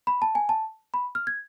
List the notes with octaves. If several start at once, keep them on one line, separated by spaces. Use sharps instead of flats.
B5
A5
G#5
A5
B5
F6
G#6